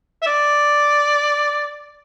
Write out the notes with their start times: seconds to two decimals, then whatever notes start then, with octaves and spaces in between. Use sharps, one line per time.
0.22 E5
0.27 D5